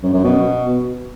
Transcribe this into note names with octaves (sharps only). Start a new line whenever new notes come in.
F#2
F#2
B2